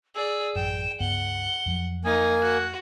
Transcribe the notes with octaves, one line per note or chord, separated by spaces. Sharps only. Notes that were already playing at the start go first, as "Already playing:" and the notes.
G#4 D5 E6
A1 F#2 G5 E7
C#2 G2 B3 F#5 G7
F2 F3 F#3
A#3 D#4 G#5 D#6
F#4 F#6